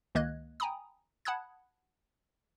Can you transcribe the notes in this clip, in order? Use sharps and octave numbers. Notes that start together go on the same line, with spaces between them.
C#2 D#3 A#3 D#5 F#6 G#6
G5 G#5 A#5 B5 D#6
F#5 A5 B5 D#6 F#6 G#6